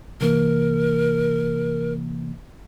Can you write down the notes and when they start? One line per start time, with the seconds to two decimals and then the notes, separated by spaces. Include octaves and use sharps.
0.21 C3 E3 A#3 A#4